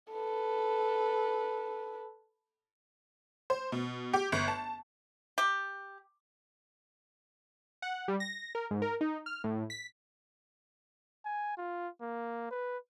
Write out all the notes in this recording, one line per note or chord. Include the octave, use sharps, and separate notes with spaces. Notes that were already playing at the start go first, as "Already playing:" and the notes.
A4 B4
C5
B2
G4
G1
A5
G4
F#5
G3
A#6
A#4
G#2
A#4
D#4
F6
A2
B6
G#5
F4
A#3
B4